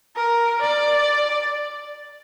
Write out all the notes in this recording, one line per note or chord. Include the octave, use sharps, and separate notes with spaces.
A#4
D5